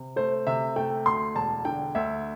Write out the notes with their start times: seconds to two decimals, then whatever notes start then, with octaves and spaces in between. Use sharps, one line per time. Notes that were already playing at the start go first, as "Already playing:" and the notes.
Already playing: C3
0.16 A3 C5
0.47 C3 E5
0.76 A3 G5
1.06 D2 C6
1.35 E1 A5
1.65 D3 G5
1.95 D2 E5